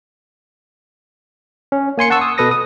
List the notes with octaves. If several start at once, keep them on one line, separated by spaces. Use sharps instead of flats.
C#4
A#3 G#5 C6 C#7
F#5 A5 C#6 E6
D#6
B2 A4 B4 D#6 A#6
D#6